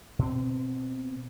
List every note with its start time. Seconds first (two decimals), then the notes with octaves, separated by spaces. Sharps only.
0.19 B2 C4